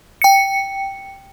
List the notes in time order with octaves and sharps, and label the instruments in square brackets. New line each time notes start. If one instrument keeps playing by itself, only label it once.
[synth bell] G5 C#7